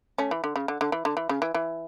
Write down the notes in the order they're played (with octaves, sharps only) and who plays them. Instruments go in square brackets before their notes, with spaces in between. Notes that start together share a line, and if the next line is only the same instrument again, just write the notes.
[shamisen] A3 C#4
E3
D3
C#3
D3
D3
E3
D3
E3
C#3
E3
E3